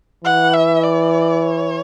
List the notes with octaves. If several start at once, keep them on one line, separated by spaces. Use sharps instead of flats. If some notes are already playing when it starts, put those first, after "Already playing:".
E3 F#5
E5
D5
C#5